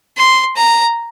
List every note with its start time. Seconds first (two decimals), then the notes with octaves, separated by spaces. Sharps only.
0.17 C6
0.56 A#5